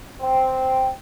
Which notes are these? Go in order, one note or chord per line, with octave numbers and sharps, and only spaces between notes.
C4